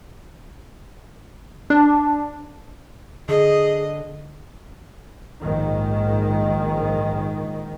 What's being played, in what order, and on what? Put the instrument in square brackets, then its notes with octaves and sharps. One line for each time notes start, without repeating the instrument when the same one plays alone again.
[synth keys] D4
[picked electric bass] D3 [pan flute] G#4 [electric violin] D#5
[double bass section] A#1 G#2 D#3